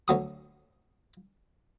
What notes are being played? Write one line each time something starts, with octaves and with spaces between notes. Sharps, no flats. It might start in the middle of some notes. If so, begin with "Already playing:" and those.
D2 F#3 D#6